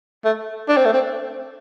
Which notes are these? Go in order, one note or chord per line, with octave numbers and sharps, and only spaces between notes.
A3
D4
C4
A3
C4